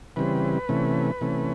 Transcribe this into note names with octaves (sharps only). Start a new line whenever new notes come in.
C#3 E3 G3 C4 B4
C3 E3 A3 C#4
C3 E3 A3 C#4